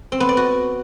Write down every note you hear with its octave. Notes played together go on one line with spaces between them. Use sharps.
C4
B3
D5
F#4